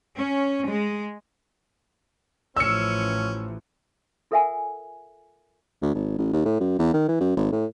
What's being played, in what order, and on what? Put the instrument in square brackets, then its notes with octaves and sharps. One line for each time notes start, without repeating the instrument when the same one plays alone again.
[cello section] C#4
G#3
[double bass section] A1 E3 F3 [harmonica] C#4 [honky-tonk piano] E6 C#7
[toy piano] F4 A4 A#4 E5 F#5 G#5
[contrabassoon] D2
G#1
A1
D#2
A2
F#2
E2
D#3
E3
F#2
G#1
A2